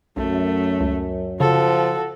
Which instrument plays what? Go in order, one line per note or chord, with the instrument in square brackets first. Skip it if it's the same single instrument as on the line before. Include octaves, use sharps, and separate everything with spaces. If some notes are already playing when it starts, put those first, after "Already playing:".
[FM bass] B1 [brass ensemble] F#2 [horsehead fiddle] A3
[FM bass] C#2
[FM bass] C#3 [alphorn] F3 [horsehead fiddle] F#4 A4